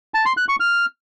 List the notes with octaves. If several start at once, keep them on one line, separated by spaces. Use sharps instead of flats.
A5
C6
F#6
C#6
F6